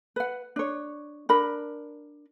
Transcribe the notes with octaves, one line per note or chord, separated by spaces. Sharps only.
B4 F#5
D4 C#5
D4 A#4 B5